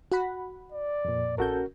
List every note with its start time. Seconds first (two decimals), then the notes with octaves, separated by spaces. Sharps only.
0.12 F#4 F#5 B5
0.72 D5
1.05 F2 A#2
1.38 A#1 C#4 F#4 A4 A#4 G6